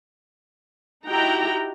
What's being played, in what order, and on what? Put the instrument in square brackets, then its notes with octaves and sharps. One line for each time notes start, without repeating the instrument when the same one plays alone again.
[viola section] D#4 E4 F#4 G4 G5 A#5